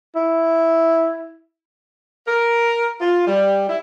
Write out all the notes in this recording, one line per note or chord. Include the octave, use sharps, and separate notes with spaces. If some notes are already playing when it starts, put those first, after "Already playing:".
E4
A#4
F4
G3
E4